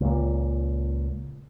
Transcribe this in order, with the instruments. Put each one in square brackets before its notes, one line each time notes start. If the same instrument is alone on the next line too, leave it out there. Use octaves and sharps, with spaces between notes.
[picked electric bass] C#2 A#2